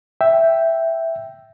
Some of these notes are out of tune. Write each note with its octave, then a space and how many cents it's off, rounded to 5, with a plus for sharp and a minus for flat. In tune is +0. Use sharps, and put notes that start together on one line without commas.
E5 +0 G5 +0